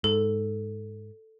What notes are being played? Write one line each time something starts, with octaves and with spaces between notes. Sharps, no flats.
G#2 A4